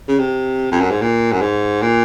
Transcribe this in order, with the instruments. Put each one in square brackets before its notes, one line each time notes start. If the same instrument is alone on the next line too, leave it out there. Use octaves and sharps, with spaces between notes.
[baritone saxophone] C#3
C3
F2
F#2
G#2
A#2
F#2
G#2
A#2